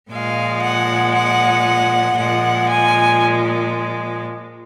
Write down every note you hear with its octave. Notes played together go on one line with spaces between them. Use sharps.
A#2 F3 G#3 F5
F#5
F#5
A#2 F3 G#3 F#5
G#5